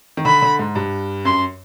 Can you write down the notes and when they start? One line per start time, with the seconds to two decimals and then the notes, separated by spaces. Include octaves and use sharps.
0.17 D#3
0.25 D3 B5
0.42 D3
0.59 G#2
0.75 G2
1.25 F#2 C6